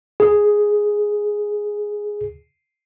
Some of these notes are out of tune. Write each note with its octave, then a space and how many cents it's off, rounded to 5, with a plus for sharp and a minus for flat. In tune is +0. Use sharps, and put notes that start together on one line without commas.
G#4 +0